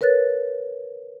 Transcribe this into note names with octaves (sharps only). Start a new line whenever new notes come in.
A#4 B4 C#5 F#6 A6